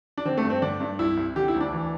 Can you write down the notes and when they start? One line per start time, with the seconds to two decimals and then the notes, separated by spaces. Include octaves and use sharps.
0.18 D4
0.25 D3 C4
0.38 A3
0.44 G2
0.50 C4
0.62 D3 D4
0.80 G2
0.99 C2 E4
1.17 C2
1.36 D3 G4
1.48 E4
1.54 D2
1.61 D4
1.73 E3